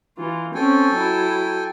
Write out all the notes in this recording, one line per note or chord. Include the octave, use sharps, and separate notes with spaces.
E3 F4
C4 C#4 A4 G5 G#5
F#3 E4